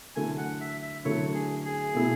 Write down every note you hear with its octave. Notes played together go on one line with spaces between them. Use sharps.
D3 F#3 A3 E4 G#5
F#5
E5
E5
D3 F#3 A3 E4 C#5
G#4
G#4
B2 A3 E4